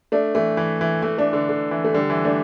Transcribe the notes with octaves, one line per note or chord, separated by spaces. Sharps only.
A3 D4
E3 A3
E3
E3
E3 A3
A3 D4
D3
D3
E3
A3
D3 G3
E3
A3 D4